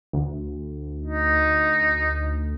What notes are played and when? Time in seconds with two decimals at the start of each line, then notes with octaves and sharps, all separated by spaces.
0.13 D2
1.02 D#4